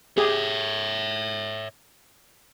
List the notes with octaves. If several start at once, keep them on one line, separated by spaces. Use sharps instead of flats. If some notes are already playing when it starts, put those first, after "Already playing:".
G4 G#4 C#5 E5